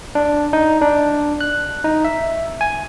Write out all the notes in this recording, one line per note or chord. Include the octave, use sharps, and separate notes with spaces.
D4
D#4
D4
F#6
D#4
E5
G#5